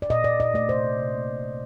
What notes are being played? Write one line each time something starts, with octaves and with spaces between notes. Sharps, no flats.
D5
A#2 D#5
A#2 D5
A#2 D#5
A3 D5
C3 C5
C3
C3
A#3
A#2
A#2